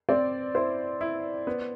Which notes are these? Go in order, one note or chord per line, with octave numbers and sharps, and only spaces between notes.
C4 D5
E4 C5
E4
B3